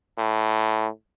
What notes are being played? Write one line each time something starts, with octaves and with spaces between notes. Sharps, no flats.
A2